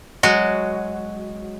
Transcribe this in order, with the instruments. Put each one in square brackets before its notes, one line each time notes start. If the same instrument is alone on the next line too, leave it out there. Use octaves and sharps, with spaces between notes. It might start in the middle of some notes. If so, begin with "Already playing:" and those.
[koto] F#3 G#3 F#4